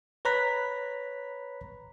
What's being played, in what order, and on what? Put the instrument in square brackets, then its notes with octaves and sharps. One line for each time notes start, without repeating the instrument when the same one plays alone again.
[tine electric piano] B4 C#5 A#5 B5 F#6 B6